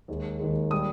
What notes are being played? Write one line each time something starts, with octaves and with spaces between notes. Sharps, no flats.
D#2 D#3 G#3
D#2 D#3 G#3
G3 A#3 D#6